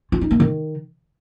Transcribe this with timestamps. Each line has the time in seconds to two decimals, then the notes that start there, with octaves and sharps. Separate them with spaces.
0.12 F4
0.21 D#4
0.31 A#3
0.40 D#3